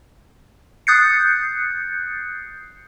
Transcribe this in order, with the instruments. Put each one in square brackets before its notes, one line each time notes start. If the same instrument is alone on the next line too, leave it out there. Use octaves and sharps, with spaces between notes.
[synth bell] D#6 F#6 G6 A6 C7 C#7